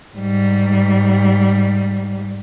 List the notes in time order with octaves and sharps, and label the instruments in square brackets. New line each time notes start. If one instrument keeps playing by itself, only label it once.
[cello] G#2 G3